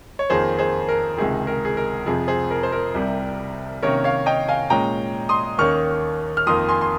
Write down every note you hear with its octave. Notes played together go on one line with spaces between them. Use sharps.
C#5
F2 D#3 A#3 G#4 C5
G#4 C5
A#4
C#2 C3 D#3 G#4
A#4
G#4
A#4
F2 C3 F3 G#4
G#4 C5
A#4
C5
A#4
C2 C3 G3
C3 D#3 A#3 C#4 A#4 C#5
C#5 F5
D#5 G5
F5 G#5
A#2 G#3 C#4 G5 A#5
C6 D#6
D#2 D#3 A#3 C#4 C#6 F6
F6
F2 D#3 A#3 C6 D#6
G#5 C6
C6